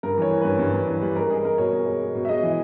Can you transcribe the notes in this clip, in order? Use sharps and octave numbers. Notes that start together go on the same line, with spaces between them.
G2 A#4
E3 C#5
E3
G2 B4
G2
G2
E3
G3
G#3 A#4
G#3 G#4
G#3 A#4
B2 C#5
G#3
G#3
G#3
B2
E5
G#3 D#5
E3